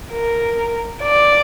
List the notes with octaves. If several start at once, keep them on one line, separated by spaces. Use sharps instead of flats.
A#4
D5